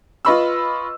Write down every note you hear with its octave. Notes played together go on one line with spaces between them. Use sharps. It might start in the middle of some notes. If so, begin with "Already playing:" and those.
F4 B4 D#5 B5 C#6 E6